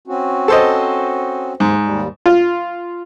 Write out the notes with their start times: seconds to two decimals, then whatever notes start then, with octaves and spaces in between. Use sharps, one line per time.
0.08 C4 C#4 F#4
0.48 A4 C5 D#5
1.60 D#2 G#2 C5
1.84 D#2 G3
2.26 F4